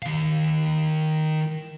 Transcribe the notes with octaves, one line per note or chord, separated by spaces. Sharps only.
D#3 F5